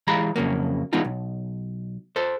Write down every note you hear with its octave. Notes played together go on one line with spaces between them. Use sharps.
E3 G#3 G4 F5 A#5 B5
F2 C#3 F#3 A#3
E3 G#3 B3 D4 D#4 F4
B1
A4 C5